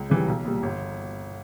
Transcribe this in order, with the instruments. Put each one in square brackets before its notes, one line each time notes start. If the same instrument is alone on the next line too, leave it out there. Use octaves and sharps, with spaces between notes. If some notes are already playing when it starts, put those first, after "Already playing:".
Already playing: [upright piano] C#2
C#3 E3 G3
B1
A#2 G3
G1